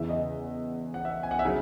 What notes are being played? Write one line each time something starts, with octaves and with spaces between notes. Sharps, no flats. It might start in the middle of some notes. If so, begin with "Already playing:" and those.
Already playing: E2 C#3 E3 E5
D#5
F#5
E5
G#5
F#5
E5
C#3 F#3